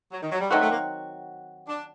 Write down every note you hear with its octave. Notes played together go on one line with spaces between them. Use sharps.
F#3
D#3
F#3
G3
D#3 F#3 A3 C4 F#4
A3
A#3
D4